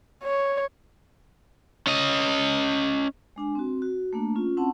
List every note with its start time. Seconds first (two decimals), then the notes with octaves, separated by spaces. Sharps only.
0.23 C#5
1.87 C#4 D#5
3.36 G#3 D4 G#5
3.55 C4 F#4
3.82 F#4
4.13 A3 A#3 D4
4.35 C#4 F4
4.57 C4 C#4 E4 F#5 A5